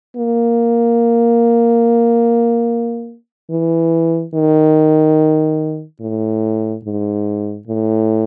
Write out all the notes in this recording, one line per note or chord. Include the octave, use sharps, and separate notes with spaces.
A#3
E3
D#3
A2
G#2
A2